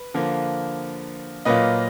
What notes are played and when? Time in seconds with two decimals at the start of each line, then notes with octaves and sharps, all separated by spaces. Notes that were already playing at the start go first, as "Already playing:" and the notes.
Already playing: B4
0.14 D3 F3 A#3
1.45 A#2 F#3 A#3 F4 B4 D#5